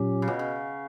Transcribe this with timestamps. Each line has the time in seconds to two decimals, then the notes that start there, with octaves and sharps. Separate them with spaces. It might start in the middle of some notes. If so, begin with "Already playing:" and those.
Already playing: A#2 F#3 C#4 G4
0.22 C#3
0.28 B2
0.39 C#3